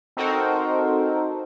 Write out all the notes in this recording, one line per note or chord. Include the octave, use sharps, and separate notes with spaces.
C4 D#4 F#4 A4 A#4 C5